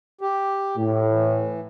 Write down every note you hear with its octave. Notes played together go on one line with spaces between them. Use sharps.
G4
A2
E3